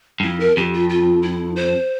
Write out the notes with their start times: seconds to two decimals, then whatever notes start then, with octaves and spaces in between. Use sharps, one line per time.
0.20 G2
0.23 F2 E4
0.40 A#4
0.57 F2 G4
0.74 F4
0.90 F4
1.23 E4
1.56 C5